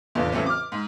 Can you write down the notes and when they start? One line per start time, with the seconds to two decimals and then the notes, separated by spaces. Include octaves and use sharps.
0.15 F1 E2 A2 D3 F4
0.32 C#3 E3 F#3 A3 C4
0.46 D6 F6
0.72 G#2